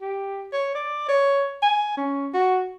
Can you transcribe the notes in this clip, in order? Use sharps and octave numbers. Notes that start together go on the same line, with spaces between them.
G4
C#5
D5
C#5
G#5
C#4
F#4